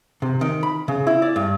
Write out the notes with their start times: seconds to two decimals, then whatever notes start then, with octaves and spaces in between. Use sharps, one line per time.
0.22 C3
0.41 D#3
0.63 B5
0.88 C#3
1.07 E4
1.22 D5
1.36 G2